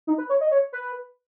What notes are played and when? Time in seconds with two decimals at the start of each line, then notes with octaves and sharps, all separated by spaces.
0.07 D#4
0.18 B4
0.29 C#5
0.41 D#5
0.51 C#5
0.73 B4